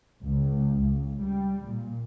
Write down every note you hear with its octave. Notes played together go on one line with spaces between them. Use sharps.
C#2
C#2
G3
A#2